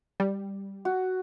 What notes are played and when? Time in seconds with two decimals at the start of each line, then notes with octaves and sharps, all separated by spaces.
0.20 G3
0.85 F#4